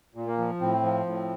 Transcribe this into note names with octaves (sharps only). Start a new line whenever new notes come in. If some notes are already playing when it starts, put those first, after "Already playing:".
A#2
A#3
F3
A2 C4
F3
A2